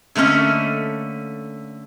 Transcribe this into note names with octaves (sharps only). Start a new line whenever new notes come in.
D3 A3 A#3 C#4 D#5